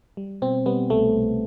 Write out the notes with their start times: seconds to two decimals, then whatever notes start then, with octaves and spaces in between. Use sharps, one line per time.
0.17 G3
0.42 B2 C4
0.66 G3 B3
0.90 C2 A3
1.14 C2